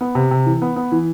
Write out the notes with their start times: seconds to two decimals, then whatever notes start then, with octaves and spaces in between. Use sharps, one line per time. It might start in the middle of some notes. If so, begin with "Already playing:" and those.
0.01 B3
0.15 C3
0.31 C3
0.46 E3
0.62 B3
0.76 B3
0.92 E3